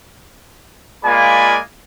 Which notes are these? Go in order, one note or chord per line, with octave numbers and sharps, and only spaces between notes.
G#3 A#3 F4 D5 G#5 B5